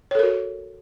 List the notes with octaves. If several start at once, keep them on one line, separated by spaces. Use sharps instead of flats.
F#4 A4 A#4 C#5